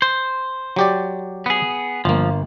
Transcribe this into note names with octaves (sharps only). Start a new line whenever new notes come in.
C5
F#3 G4 D5
B3 G#4
G1 F3 A#3